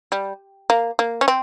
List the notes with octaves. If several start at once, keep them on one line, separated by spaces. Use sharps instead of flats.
G3
A#3
A#3
C#4
C4